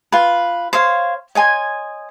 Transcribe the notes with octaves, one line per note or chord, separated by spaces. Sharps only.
F4 B4
C5 C#5 F5
C#5 D#5 G#5 C6